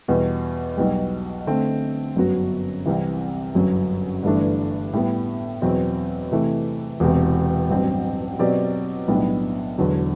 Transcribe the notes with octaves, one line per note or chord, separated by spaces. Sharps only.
E2 B2 G3
B1 B2 G3
D3 A3 C4
G1 F#2 F#3 B3 F#4
C2 C3 E3
G1 F#2 F#3
G1 G2 E3 A3 D4
A2 G3 B3
E2 B2 F#3 C4
C3 E3 A3
E1 E2 C3
A1 G2 F#3 C4
B2 F#3 C4 G4 D5
B1 A2 G3 B3 D4
E1 E2 D3 F#3